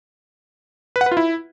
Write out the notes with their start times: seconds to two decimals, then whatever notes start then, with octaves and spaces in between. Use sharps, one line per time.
0.96 B4
1.01 F#5
1.06 B4
1.12 F4
1.17 E4